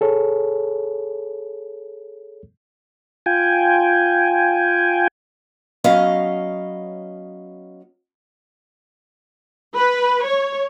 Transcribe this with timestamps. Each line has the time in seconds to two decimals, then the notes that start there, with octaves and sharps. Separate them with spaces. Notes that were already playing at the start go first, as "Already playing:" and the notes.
0.01 G#4 A4 C#5
3.26 F4 G5 G#5
5.84 F#3 B3 C#4 D#5 F5 A#5
9.74 B4
10.26 C#5